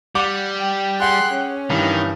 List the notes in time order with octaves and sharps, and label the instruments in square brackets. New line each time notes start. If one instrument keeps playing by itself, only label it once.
[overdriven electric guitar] G3 [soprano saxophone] F#5 [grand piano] D6
[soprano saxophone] G5
[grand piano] G#4 F#5 [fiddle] C6 F#6
[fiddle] C#4
[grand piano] G2 E3 [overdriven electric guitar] D#3 [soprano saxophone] B3